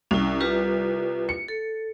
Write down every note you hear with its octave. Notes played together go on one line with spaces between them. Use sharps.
C2 C#4 E4
F4 G4 B4
C#7
A4